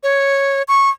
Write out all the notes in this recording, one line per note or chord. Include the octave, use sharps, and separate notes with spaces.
C#5
C#6